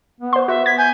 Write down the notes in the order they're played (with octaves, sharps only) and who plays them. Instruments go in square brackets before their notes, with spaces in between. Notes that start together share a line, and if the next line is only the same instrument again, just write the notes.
[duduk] B3
[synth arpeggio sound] C5 C6
[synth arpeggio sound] F#4 [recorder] E5
[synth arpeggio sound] G#6 [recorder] B6
[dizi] G#5 [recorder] G6